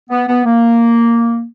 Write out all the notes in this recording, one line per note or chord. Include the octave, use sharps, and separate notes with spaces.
B3
B3
A#3